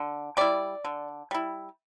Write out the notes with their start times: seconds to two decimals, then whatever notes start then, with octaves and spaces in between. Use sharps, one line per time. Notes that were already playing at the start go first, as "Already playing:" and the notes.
Already playing: D3
0.37 G3 E4 D5
0.85 D3
1.31 G3 E4